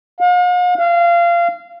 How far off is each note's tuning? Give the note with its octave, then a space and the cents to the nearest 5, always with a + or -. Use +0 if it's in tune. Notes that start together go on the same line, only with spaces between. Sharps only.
F5 +45
F5 -25